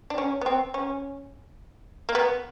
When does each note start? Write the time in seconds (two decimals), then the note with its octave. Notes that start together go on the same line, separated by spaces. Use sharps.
0.10 D4
0.18 C#4
0.41 B3
0.46 C4
0.74 C#4
2.09 A#3
2.15 B3